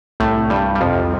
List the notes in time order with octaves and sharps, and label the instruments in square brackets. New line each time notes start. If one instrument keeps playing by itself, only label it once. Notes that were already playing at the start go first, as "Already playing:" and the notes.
[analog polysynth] C2 [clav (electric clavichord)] A2 A3
[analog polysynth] C2 [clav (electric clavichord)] G2 G3
[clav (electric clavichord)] G3
[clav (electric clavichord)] F2 F3 [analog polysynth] C3